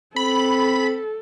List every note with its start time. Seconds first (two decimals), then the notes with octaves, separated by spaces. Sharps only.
0.16 C4 A4 B5